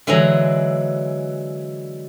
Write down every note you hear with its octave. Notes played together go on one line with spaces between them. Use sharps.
D3 E3 F#3 G#3 G#5 A#5